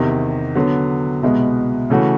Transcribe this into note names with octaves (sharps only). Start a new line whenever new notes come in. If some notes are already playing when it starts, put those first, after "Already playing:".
Already playing: E2 C3 D#3
D3 F#3 B3
C2 B2 G#3 B3
C#3 E3 A3 C#4 F#4